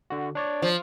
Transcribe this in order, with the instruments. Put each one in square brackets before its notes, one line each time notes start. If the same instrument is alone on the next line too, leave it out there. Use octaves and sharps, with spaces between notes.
[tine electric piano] D3 F#4
D4 C#5 D5
[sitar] F3